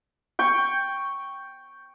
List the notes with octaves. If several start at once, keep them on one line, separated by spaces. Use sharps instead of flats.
G5 C#6